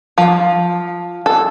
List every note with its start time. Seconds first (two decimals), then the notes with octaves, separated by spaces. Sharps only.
0.18 F3
1.26 A4